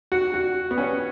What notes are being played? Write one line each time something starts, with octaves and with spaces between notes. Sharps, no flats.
F#4
F#4
B3
C#4